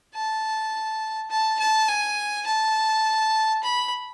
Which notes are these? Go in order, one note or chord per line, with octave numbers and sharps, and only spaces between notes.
A5
A5
A5
G#5
A5
B5